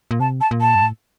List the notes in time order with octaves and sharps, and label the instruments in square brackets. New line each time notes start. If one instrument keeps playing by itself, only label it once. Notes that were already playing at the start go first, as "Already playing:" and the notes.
[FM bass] A#2
[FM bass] C3 [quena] A5
[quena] A5
[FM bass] A#2
[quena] A5
[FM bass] G2
A2